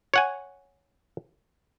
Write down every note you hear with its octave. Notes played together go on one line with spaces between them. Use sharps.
C#5 F#5 G#5